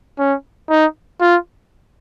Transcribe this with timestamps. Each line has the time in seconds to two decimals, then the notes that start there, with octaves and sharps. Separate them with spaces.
0.19 C#4
0.70 D#4
1.21 F4